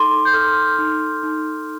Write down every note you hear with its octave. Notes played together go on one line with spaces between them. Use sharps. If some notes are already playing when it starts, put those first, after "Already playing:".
Already playing: D#4 A4 C6 D6
G6
A4 F6
D#4
D#4